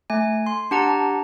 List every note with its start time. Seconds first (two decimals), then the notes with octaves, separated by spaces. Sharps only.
0.10 A3 G#5
0.46 C6
0.71 D4 G4 F#5 A5 A#5